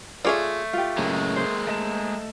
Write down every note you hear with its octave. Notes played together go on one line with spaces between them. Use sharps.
A3 F4 G#4 C#5 D5
F4 G4
F#2 A2 C#3 G#3 A#3
C5
A3 D#5 A5